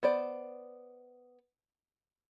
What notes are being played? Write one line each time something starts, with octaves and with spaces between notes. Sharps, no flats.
B3 C5 D5